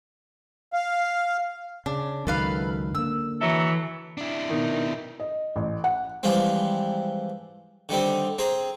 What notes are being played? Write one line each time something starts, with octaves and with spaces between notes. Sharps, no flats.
F5
C#3 D4
C#2 F#2 D#3 A4 B4 F5
D3 A#3 E6
E3 F#3 A4 E5
D4 E4
B2 D#3
D#5
A1
F#5
E3 F3 G3 G#3 C4
D3 D#3 G3 C4
C4 G#4 A#5